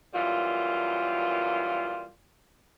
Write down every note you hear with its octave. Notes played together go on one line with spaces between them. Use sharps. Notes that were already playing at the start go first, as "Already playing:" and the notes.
F#2 A#2 E3 G3 F4